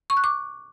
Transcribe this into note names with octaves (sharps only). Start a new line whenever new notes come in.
C#6
F#6
D6